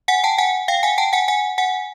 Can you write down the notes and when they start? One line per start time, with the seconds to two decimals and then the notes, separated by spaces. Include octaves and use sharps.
0.08 F#5 G#5
0.24 G5 A5
0.38 F#5 G#5
0.68 F5 G5
0.83 F#5 G#5
0.98 G5 A5
1.13 F#5 G#5
1.28 F#5 G#5
1.58 F#5 G#5